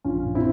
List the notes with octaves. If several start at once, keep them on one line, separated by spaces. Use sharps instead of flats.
A#1 C#4 F4
A#2
C4 E4